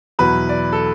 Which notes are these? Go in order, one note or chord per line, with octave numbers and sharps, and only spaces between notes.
E2 B2 F#3 B4
D5
A4